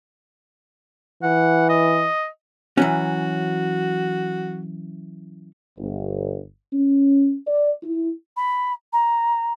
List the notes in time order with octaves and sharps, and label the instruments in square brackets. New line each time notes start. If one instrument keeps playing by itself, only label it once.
[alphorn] E3 [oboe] F#5
[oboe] D#5
[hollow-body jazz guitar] E3 F#3 C#4 [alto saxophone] F#4
[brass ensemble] G1
C#4
D5
E4
[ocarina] B5
A#5